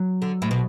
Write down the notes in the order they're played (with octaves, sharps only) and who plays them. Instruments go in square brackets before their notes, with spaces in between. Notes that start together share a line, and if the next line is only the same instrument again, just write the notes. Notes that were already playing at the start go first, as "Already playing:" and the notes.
Already playing: [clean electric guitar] F#3
[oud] D3
A2
B2